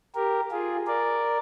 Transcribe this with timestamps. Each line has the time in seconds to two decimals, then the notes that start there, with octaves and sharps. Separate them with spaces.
0.15 G4 A#4
0.51 F4 G#4
0.87 A#4 D5